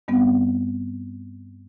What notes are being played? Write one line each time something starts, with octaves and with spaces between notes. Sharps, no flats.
G2 G3 B3 C4